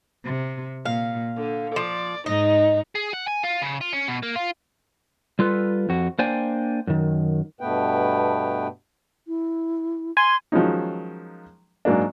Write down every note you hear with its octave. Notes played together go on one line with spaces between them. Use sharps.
C3
A#2 F5
D3
F3 D5
G#2 D#4 D#5
G#4
F#5
G#5
F4
C#3
F4
C#4
B2
A#3
F4
G3 F4 A4 B4
F2 F#4
A#3 D4 C5 D5 G5 G#5
F#2 D#3
G2 B2 A3 B3 B4 G5
E4
G#5 C6
D#3 F3 F#3 G#3 C#4 D#4
G#2 F#3 A#3 D4